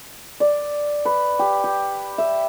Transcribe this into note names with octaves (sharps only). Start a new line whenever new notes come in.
D5
B4
G4
G4
E5